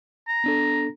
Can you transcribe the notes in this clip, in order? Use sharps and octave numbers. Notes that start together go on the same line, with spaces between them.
A#5
B3 D4 A4